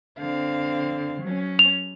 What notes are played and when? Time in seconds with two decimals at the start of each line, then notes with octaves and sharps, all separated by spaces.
0.18 D3 C4 F5
1.23 F#3 C#4
1.59 F7